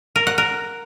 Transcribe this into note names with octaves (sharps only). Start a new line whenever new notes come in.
A#4
F#5
A#4